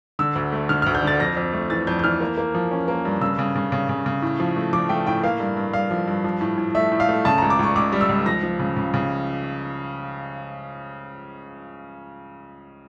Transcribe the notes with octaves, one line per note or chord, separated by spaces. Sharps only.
D3 E6
D2
A3
D3 F6
D2 F6
G6
D3 A6
F2 A#6
F2
A3
E3 A6
F2 G6
G6
E3 F6
A#3
A#3
F3
C#4
A#3
G2
C#3 E6
C#3
C#3
C#3
C#3
C#3
A2
F3
A3
F3 D6
A3 G5
A2 G5
A#3 F5
G2
G2
G2 F5
F3
G2
F3
A2
A2
A3 E5
A2
F5
A3
C#3 A5
C#2 A#5
D6
C#2 C#6
C#2 D6
G3
E6
C#2
F3 A#6
F3
C#3
C#3
C#3